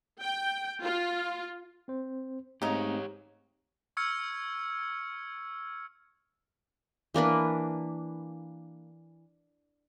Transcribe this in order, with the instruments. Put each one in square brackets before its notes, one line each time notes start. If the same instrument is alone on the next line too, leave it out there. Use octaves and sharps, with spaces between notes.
[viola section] G5
F4
[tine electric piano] C4 C5
[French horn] G#2 [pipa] C#3 D#4 [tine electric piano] A3 C4 [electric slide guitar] G4 C#5
[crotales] C#6 E6 F6 G#6 C#7
[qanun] E3 A#3 D4 B4